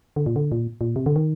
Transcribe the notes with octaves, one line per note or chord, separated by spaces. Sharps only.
D3
A#2
D3
A#2
A#2
C3
D3
D#3